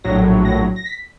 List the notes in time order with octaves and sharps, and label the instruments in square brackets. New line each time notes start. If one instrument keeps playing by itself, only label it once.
[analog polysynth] A#1 A2 F#3 A#6
A#6
A#6
B6